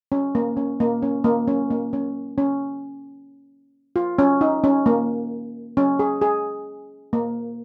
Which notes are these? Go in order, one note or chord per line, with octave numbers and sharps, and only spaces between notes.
C#4
A#3
C#4
A#3
C#4
A#3
C#4
A#3
C#4
C#4
F4
C#4
D#4
C#4
A#3
C#4
G#4
G#4
A#3